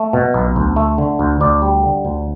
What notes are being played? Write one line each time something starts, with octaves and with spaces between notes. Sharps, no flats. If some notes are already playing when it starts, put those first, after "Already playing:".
Already playing: A3
B2
B1
D2
A3
D3
D2
D2 D5
G3
D3
D2